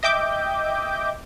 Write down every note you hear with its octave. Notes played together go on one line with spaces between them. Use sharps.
D#5 E5 G5 D6 G6